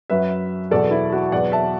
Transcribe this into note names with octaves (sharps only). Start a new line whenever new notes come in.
F#2 F#3 B4 E5
E2 B2 F#3 A4 D5
E4
F#4
E2 B2 F#3 D5 F#5
E5 A5